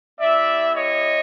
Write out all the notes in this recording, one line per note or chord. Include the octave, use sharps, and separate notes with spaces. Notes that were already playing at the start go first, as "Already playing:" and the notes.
B3 E4 G4 D5 E5
C#5 D#5